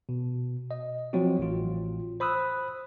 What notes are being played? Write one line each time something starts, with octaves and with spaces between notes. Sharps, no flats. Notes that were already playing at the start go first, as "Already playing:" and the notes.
B2
D#5
F3 F#3 C4 F4 F#4
A1 A2 F4
C5 B5 D#6 E6 F#6